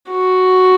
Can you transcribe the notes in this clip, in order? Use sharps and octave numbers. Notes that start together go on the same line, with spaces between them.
F#4